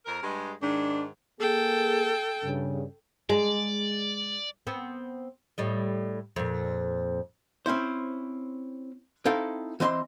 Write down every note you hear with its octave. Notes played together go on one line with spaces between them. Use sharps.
F2 A#4
G2 G#3
G#2 D#3 D4
A#3 G#4 A4 G5
G2 C#3
G#3 D5
B3 C4
A2 G3 D#5
F2 A#2
C4 C#4 E4 C5
C4 D#4 E4 A4 F5 G5
E3 C4 D#5 G#5 C6